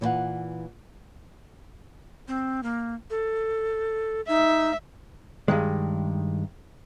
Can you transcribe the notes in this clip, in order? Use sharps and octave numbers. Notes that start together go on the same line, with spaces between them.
A#2 E3 A4 C5 F5 F#5
C4
A#3
A4
D#4 E5
G2 D#3 G#3